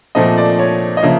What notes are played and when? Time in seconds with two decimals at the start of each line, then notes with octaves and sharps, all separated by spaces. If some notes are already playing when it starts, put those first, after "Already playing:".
0.15 A#2 F3 A3 C4 D#5
0.38 D5
0.59 C#5
0.97 D#5
1.03 C#3 F3 A#3 E5